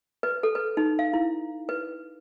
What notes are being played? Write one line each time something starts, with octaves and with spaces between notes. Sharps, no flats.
B4
A4
B4
D#4
F5
E4
B4